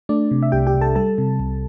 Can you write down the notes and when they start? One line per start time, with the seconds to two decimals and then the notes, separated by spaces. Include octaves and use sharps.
0.09 A3 D4 D5
0.31 C3
0.43 E5
0.52 C2 G4 G5
0.67 G4 G5
0.74 C2
0.81 A4 A5
0.95 G3 A4 A5
1.18 C3
1.39 C2